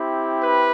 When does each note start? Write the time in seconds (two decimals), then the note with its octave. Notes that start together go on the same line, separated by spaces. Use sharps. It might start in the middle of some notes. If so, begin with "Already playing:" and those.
Already playing: C4 E4 G4
0.43 B4